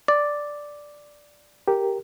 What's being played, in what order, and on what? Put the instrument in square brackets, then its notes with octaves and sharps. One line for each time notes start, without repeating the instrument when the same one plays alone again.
[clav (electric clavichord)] D5
[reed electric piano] G4 A#4